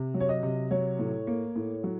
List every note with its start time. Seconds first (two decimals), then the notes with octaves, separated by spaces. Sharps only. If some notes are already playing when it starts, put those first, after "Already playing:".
Already playing: C3
0.14 F#3
0.20 C#5
0.29 D#5
0.43 C3
0.71 F#3 C#5
0.99 A2
1.27 A#3
1.56 A2
1.84 F#3